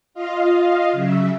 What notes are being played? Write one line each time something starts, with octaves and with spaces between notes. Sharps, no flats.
F4 D#5 F5
C#3 F#3 E5